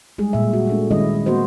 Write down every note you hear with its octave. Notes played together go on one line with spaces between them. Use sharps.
G3 G#3 G#4
A#2 E5
F#4
G#3 A3 D4
D#3 G3 G#3 C#4 E4 D#5
A#3 B3 F#4 A#4 C5 D#5